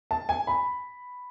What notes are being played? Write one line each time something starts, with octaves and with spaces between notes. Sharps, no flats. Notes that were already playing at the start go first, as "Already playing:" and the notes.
A5
G#5
B5